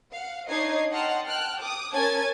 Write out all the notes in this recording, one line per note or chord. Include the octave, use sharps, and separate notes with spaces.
F5 F#5
D4 D#4 C#5 D#5 G#6 C7
D#5 F#5 G5 A5 C6 F6
G5 A5 F6 F#6
D6 D#6
C#4 A#4 G#5 A5 G#6 A6